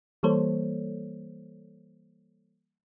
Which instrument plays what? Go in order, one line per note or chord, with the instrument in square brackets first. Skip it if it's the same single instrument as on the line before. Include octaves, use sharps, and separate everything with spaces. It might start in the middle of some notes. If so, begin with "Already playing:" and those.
[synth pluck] E3 G3 A#3 A4 C5 C#5